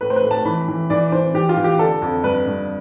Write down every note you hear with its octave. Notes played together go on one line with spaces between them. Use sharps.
A2 B4
C5
B4
A2
A5
E3 B5
E3
E3 D5
E3 C5
E3 G4
F4
E3
G4
D3 A4
F2
G2 B4
G2